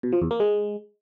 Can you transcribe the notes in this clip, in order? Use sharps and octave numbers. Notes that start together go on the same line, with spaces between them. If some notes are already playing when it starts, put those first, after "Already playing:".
B2
F3
E2
A#3
G#3